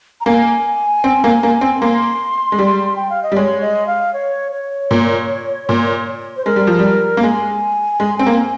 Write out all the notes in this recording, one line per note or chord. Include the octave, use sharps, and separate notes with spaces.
A#5
A#3 G#5
C4
A#3
A#3
C4
A#3 C6
G#3
G3
G5
F5
D#5
G3
G#3 C#5
D#5
F5
C#5
C#5
A#2
A#2
C5
G#3 A#4
G3
F3
G3
A#3
G#3 G#5
G#3
C4
A#3